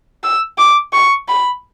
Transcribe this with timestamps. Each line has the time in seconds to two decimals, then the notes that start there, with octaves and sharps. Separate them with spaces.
0.24 E6
0.58 D6
0.93 C#6
1.29 B5